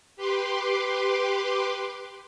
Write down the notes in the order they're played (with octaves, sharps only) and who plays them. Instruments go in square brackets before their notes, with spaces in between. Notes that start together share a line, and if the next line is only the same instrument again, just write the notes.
[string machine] G4 B4 C6 D6